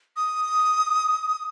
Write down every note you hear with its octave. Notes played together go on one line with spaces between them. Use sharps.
D#6